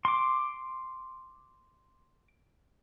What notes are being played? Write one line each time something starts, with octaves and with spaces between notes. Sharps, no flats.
C6 D6